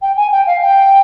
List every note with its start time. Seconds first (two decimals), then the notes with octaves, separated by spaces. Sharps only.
0.02 G5
0.17 G#5
0.32 G5
0.47 F5
0.62 G5